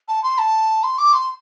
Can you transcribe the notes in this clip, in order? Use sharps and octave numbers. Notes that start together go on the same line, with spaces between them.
A5
C6
A5
C6
D6
C6